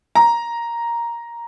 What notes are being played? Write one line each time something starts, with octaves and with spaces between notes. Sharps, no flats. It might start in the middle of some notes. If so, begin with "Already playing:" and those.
A#5